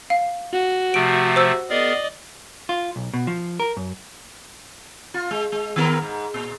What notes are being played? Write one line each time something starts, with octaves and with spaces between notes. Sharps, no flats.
F5
F#4
C3 F3 A3 D7
C5 E6
B3 G#4 A#4 D5 D#5
F4
B1
B2
F3
A#4
F#2
F4
G#3
G#3
D#3 B3 A#4
G#2
A#2